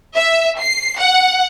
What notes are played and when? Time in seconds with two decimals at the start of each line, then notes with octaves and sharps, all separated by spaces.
0.15 E5
0.59 C7
0.98 F#5